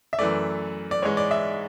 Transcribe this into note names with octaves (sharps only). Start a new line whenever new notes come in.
E5
F#2 E3 A3 D5
D5
G#2 E3 G#3 C#5
D5
E5